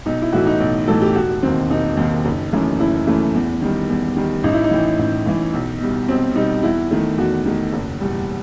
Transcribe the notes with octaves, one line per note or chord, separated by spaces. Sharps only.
B1 D#4
E4
A2 E3 A3 F#4
D#4
B1
A2 E3 A3 A4
G4
E1 F#4
D#2 D#3 C4
E1 D#4
D#2 D#3
F#1
F#2 E3 A3
F#1 E4
F#2 E3 A3
E2
D#3 G3
E2
D#3 G3
A1 D#4
E4
D#4
A2 E3
A1
A2 E3
B1
B2 G3
B1 C4
B2 G3 D#4
E2 E4
D#3 A3
E2 F#4
D#3 A3
F#1
E2 B2 G3